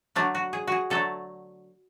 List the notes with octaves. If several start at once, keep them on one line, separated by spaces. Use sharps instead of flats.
D3 F#3 A3 D4
F#4
G#4
F#4 G#4
D3 F#3 A3 A4